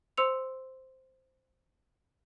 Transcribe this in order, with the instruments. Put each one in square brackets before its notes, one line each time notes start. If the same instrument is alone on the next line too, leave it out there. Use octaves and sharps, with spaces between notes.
[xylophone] C5 C6 E6 C#7 F7